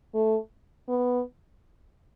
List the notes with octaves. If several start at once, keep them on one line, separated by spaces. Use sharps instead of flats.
A3
B3